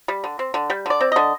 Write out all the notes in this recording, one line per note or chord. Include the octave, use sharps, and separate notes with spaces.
G3
D3
C4
D3
G3 G5
D3 D5
C4
D3 D#5